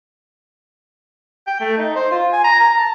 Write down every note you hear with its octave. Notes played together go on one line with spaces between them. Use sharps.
G5
A3
D#4
C5
F4
G#5
A#5
A#5
A5